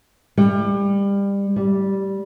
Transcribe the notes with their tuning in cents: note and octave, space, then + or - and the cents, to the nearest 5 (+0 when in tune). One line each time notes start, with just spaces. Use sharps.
G3 +25
G3 -10